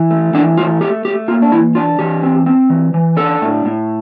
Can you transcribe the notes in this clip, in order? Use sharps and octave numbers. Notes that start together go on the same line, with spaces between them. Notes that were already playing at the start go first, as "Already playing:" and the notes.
Already playing: E3
A3
E3 D4
A3 F4
A3 G4
A3 G4
A#3 F4
D4
E3 E4
D4 F4
E3 G4
C4
C4
E3
E3
D4 A4
A2
A2